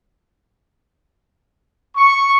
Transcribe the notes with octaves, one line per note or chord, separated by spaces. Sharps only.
C#6